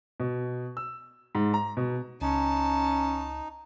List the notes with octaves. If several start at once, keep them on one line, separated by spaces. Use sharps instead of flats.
B2
E6
G#2
A#5
B2
C#2 C#4 D#4 A5